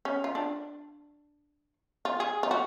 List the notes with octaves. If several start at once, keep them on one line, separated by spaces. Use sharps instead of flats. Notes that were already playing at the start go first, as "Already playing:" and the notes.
C#4
F4
D4
F4
G#4
F4
F#4